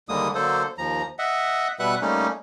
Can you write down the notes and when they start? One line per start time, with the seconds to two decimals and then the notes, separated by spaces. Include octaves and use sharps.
0.09 D#2 D3 G3 G#3 A#3 D#6
0.35 D3 F#3 A#3 A4 C5
0.78 D#2 F3 A#5
1.19 D#5 E5 F#5
1.79 B2 G3 B4 E5 F#5 F#6
2.02 G3 A3 A#3 C#4 D#4